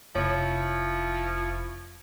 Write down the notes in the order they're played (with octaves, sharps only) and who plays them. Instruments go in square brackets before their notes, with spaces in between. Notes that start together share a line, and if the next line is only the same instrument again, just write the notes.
[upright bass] F1 [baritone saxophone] F3 [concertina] E4 C#6 [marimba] C#5